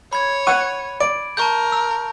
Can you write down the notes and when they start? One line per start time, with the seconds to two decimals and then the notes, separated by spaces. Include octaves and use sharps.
0.13 C#5 B5 G#6
0.47 F#5 C#6 D#7
1.00 D5 D7
1.37 A#4 A5 C#6 G6
1.72 E6